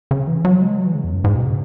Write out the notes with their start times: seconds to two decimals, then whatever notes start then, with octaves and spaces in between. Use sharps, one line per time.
0.11 C#3
0.27 E3
0.45 F#3
0.62 G#3
0.78 F#3
0.87 E3
0.95 C#3
1.04 E2
1.12 F#2
1.24 G#2
1.36 B2
1.46 C#3